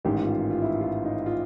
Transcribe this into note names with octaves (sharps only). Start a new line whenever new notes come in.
A1 G#2 D#3 G4
F4
F4
E4
F4
D#4
F4